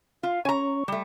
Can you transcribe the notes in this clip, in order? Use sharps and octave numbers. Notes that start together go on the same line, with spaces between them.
F4 F5
C#4 G#5 A#5 C#6
G3 A3